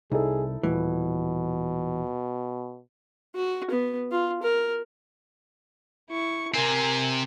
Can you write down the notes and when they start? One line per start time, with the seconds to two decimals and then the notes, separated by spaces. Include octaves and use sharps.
0.12 C2 D#4 E4 G#4 A4
0.63 D#1 B2 E3
3.35 F#4
3.71 B3
4.11 F4
4.43 A#4
6.10 E4 C#6
6.54 C3 C4 A#4 G#5